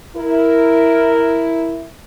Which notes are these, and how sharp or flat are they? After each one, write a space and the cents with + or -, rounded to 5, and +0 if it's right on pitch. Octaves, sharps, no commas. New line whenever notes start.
E4 +0 A#4 +0